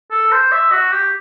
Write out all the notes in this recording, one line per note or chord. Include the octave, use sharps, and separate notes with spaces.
A4
C5
E5
F#4
G4